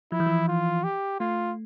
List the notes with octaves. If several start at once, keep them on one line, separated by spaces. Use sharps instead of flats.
F3 E4
E3
F3
F4
G4
A3 F4